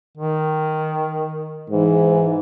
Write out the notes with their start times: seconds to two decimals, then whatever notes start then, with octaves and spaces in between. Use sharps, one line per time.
0.17 D#3
1.70 G#2 E3